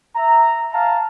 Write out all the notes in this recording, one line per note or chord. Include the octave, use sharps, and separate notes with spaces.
E5 A#5
F5 A5 A#5